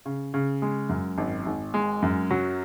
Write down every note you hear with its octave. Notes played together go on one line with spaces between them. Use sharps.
C#3
C#3
G#3
F#2
G#1
G#1
G#3
F#2
F#3